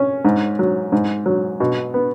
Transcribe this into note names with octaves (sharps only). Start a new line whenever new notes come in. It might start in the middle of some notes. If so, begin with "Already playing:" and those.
Already playing: C#4
G#2
F#3
G#2
F#3
B2
B3